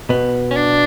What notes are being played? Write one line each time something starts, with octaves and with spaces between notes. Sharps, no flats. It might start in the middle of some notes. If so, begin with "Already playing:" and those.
B2 B3
C#4
D4